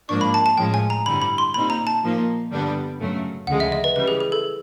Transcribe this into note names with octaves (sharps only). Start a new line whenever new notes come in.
G#2 F3 A#3 D4 C#6
B5
A5
A5
A2 F3 G#3 C#4 G5
G#5
A#5
G2 D3 G3 C4 E4 B5
B5
C6
A#2 G3 C4 D#4 B5
A#5
A5
A#2 F3 A#3 D#4
G2 D3 G3 B3 D4
F#2 C#3 F#3 A3
D2 C#3 F3 G#3 F#5
E5
D#5
B4
C#3 E3 G3 B4
G#4
G#4
A4